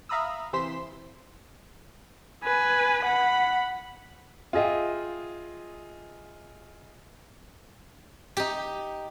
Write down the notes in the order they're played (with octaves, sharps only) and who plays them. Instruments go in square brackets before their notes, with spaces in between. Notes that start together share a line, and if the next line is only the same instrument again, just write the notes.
[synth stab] E5 F5 A#5 B5 D#6 E6
C3 E3 C5 C6 B6 E7
[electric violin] B4 G#5
F#5 B5
[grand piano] F4 G#4 D#5 E5 G5
[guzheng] D#4 G4